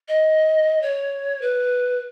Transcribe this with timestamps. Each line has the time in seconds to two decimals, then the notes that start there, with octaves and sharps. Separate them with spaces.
0.08 D#5
0.82 C#5
1.42 B4